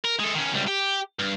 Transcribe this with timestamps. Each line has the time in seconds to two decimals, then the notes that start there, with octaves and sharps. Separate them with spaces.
0.04 A#4
0.19 G#3 A4
0.34 D#3 C#4
0.54 C#2 G3
0.68 G4
1.19 G2